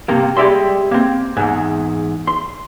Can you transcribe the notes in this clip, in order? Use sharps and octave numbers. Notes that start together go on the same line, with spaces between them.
G2 C3 A#3
G3 G#3 D5 E5 C6
A#3 C4
E2 G#2
C6